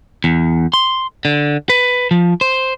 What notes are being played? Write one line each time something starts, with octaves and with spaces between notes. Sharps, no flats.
E2
C6
D3
B4
F3
C5